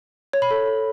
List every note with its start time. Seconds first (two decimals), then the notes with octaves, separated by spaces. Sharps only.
0.33 C#5
0.42 B5
0.51 A4